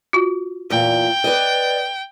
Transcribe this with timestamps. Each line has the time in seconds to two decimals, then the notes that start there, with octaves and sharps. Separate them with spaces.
0.13 F4 F#4
0.70 E2 A#2 G5
1.24 B4 D5 D#5